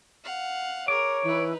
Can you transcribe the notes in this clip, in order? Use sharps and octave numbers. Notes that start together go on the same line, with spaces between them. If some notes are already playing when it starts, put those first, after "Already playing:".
F5 F#5
G#4 A#4 C#5 D6
E3 D#4 B4